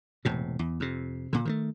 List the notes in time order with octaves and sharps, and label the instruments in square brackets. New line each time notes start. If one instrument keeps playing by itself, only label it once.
[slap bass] E1 A2 C3
E2
F2 C3
A#2 D3
D#3 E3 A3